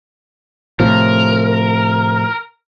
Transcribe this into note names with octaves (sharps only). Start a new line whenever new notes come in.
A2 C3 F3 A#4